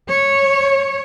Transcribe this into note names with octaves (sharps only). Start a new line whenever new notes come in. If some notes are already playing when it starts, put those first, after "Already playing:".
C#5